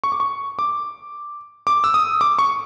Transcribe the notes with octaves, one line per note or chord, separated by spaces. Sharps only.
C#6
D6
C#6
D6
D6
E6
D#6
D6
C#6